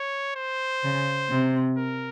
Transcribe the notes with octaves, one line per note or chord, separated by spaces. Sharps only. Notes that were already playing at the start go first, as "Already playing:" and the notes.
Already playing: C#5
C5
C#3
C3
A#4